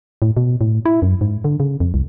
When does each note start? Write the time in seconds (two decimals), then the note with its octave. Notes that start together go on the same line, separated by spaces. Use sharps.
0.22 A2
0.37 B2
0.61 A2
0.85 E4
1.02 F#2
1.21 G#2
1.44 D3
1.60 C#3
1.80 F2
1.94 C2